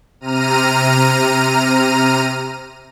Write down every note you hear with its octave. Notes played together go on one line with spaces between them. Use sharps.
C3 A#5 F6 D#7